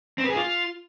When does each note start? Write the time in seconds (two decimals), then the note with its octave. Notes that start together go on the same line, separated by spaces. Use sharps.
0.18 C4
0.24 B4
0.30 G#4
0.36 F4